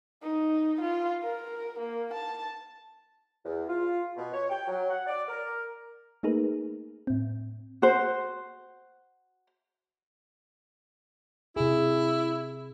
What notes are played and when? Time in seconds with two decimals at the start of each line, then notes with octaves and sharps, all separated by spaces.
0.22 D#4
0.81 F4
1.23 A#4
1.79 A#3
2.14 A5
3.44 E2
3.68 F4
4.16 B2
4.33 C#5
4.50 G5
4.68 F#3
4.90 F#5
5.06 D5
5.28 A#4
6.23 A3 A#3 D#4 G#4 A#4 B4
7.07 A2 C4
7.82 F#4 C5
11.56 C3 E4 G#4